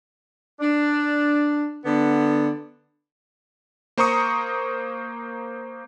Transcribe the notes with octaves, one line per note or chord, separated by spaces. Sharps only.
D4
D3 B3
A#3 C5 A#5 C#6 D#6 C#7